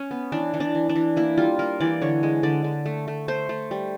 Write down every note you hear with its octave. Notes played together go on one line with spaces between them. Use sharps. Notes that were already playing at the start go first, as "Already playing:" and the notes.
Already playing: C#4
B3
E3 D4
E3
D4
E3
D4
E3
A#3 E4
G3 F4
A#3 A#4
E3 D5
D3 C#5
G#3
D3 D5
D3
A3
A3
A3 C5
A3
G3